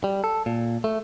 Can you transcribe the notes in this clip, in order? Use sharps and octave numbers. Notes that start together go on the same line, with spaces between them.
G3
A4
A#2
A3